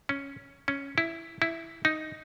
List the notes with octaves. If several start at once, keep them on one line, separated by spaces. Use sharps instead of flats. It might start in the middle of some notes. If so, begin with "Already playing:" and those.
C#4
C#4
E4
E4
D#4